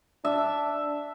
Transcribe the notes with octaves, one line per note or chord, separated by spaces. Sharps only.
D4 E5